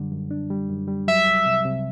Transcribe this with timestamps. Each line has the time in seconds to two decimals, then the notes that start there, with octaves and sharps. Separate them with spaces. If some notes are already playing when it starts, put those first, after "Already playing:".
Already playing: F#2 D3 G3
0.11 F#2
0.31 D4
0.50 G3
0.69 F#2
0.88 G3
1.07 F#3 E5
1.26 C2
1.46 C3
1.65 C3